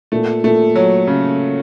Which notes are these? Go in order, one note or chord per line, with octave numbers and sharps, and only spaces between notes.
A#2 A3
A#2 A3
F#3
C#3